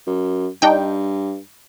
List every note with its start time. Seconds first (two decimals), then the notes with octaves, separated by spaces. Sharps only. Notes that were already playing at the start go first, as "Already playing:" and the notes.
0.07 F#2
0.62 G2 D4 D#4 G5